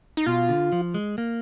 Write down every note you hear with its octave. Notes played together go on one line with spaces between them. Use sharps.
D#4
B2 F4
D3
F3
G#3
A#3